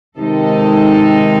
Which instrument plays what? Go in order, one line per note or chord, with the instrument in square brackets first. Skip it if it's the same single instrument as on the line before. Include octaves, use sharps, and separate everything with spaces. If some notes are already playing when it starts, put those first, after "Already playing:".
[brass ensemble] C3 D#3 [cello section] G#3 D#4 A4